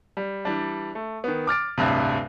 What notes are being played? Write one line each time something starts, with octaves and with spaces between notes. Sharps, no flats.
G3
E3 G3 D4
A3
D#3 B3
D6 F6 A6 D7
D1 A1 G2 C3